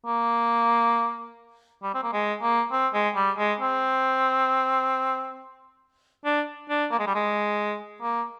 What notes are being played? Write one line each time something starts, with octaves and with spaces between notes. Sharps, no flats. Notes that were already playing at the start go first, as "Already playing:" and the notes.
A#3
G3
C4
A#3
G#3
A#3
C4
G#3
G3
G#3
C4
D4
D4
A#3
G#3
G3
G#3
A#3